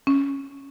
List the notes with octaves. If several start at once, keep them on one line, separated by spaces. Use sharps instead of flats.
C#4